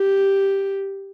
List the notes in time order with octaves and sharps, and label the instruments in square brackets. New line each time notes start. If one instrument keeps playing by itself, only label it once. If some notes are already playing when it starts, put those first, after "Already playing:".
Already playing: [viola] G4